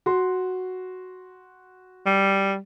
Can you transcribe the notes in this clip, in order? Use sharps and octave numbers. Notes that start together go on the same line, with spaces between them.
F#4 C6
G3